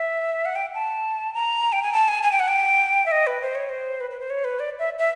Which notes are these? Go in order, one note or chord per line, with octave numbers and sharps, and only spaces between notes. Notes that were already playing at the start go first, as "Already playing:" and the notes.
Already playing: E5
F#5
G5
A5
A#5
G5
G#5
A5
G#5
G#5
G5
F#5
G5
E5
D#5
B4
C5
C#5
C5
B4
B4
C5
C#5
B4
D5
E5
E5